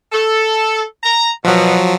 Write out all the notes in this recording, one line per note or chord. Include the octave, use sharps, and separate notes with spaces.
A4
A#5
B2 F3 F#3